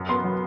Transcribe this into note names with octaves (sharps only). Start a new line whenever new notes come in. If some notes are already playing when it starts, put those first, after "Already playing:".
Already playing: F#2
B3 C6
F#3